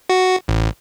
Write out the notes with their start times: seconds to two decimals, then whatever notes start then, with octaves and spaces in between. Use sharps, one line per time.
0.09 F#4
0.48 A1